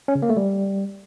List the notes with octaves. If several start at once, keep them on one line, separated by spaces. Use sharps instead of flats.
C#4
C#3
A#3
A3
G3